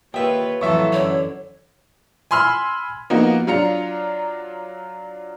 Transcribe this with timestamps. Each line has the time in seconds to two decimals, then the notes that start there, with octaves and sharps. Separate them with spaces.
0.14 D#2 F4 B4 C#5 E5 G5
0.61 F2 A2 E3 F#3 F4 A4 E5 C#6
0.92 F#2 D3 C#5
2.31 G#5 B5 C6 E6 F6
3.10 F3 A#3 B3 D#4 F#4
3.47 F#3 D4 F4 A#5 C#7 F7